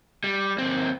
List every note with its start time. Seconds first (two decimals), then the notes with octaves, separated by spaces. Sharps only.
0.24 G3
0.58 D#2 C4